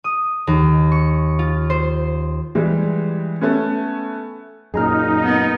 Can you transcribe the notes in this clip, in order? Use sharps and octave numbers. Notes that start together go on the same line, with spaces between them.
D#6
D#2
C#6
F4
C5
E3 G3 G#3 G4
A3 B3 C#4
F#2 A#2 D#4 G#4 A#5 F6
B3